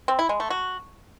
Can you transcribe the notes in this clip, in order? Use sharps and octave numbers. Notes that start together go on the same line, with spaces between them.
C4
E4
G#3
A3
F#4